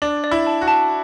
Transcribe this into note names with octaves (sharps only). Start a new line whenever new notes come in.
D4 D5
D5
E4
A5
F#4
A5